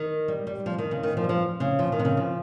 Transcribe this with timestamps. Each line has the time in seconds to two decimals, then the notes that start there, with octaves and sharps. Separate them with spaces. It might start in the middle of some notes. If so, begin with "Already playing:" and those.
Already playing: D#3
0.28 G3
0.47 G3
0.66 F3
0.78 D#3
0.91 C#3
1.03 D#3
1.17 F3
1.24 G3
1.29 F3
1.60 C#3
1.79 F3
1.92 D#3
1.99 C3
2.05 C#3
2.17 F3